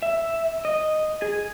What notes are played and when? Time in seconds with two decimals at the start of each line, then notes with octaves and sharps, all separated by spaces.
0.02 E5
0.65 D#5
1.22 G#4